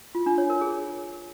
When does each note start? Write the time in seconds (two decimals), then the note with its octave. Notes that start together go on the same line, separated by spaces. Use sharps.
0.15 F4
0.26 D4
0.38 C#5
0.50 A#4
0.61 G#4